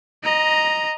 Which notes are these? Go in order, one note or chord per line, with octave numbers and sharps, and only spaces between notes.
D#5 A#5